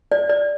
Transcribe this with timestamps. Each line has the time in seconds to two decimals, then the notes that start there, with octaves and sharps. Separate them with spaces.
0.12 D5
0.30 D5